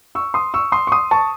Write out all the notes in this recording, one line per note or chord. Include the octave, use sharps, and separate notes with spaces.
C#6 E6
C6 D#6
C#6 E6
C6 D#6
C#6
C6 D#6
A5 C#6